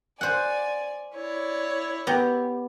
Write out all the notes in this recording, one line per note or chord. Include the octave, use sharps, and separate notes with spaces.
C5 D5 F#5 G#5
E4 C#5 D5
B3 G4 A#5